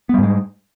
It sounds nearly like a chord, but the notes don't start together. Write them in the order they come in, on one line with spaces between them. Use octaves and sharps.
B3 G3 G#2 G#3